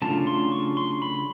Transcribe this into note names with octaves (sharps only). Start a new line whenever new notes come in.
C#3 F#3 A3 D4 F4 A5
C6
C#6
C6
B5